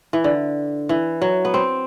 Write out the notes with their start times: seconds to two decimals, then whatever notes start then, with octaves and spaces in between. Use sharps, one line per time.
0.13 E3
0.24 D3
0.89 E3
1.21 F#3
1.45 B3
1.54 C4